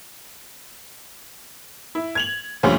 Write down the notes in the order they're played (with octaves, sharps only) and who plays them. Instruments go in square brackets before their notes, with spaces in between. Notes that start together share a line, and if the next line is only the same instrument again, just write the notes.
[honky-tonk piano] E4
G#6 F7 F#7
D2 A#2 D3 F3 G3 C#4